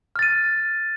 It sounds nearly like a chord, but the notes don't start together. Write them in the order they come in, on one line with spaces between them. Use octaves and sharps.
F6 A6 D#7